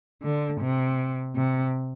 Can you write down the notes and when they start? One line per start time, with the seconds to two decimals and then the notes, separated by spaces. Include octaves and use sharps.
0.23 D3
0.61 C3
1.36 C3